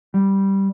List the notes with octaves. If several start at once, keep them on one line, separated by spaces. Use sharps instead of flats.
G3